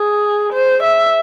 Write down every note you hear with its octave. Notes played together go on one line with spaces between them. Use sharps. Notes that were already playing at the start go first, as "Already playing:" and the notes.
Already playing: G#4
C5
E5